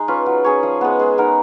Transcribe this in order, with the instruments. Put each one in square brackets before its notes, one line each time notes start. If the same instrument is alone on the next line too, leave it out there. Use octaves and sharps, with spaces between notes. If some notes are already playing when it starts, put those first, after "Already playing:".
Already playing: [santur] G#3 D#4 G#4
C#4 F4 B4
F#3
C#4 G#4 C#5
F3
G#3 B3
G#3
B3 D#4 A#4